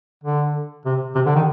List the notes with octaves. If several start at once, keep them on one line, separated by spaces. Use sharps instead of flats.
D3
C3
C3
D3
D#3